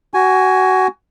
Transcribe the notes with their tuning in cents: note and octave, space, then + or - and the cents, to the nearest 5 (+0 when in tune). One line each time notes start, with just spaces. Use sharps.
F#4 +20 G#5 +0